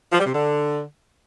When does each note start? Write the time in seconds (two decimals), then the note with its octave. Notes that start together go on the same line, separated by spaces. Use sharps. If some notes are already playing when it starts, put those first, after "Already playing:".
0.12 F3
0.19 G3
0.26 C3
0.33 D3